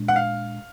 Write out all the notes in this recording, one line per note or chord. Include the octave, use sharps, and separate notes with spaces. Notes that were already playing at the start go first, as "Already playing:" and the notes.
Already playing: A#2 G#3 D4
F#5
F5